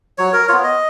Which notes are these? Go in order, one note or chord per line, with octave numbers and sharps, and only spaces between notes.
F#3 C#5
A#4
B3 F4 C#5
D#5